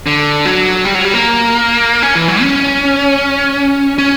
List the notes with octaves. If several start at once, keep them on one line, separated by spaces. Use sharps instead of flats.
D3
F#3
G3
F#3
G3
A#3
C#4
E3
F#3
C#4
C#4